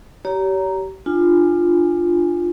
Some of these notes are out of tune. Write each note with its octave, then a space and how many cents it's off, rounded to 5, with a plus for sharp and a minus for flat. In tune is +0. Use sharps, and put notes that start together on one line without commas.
G4 -30 C#5 +35 A#5 +0
D4 +30 F4 +0 G#5 -10